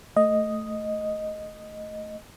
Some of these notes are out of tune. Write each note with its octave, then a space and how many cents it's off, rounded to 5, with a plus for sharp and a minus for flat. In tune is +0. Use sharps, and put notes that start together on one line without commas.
A3 +0 D#5 +0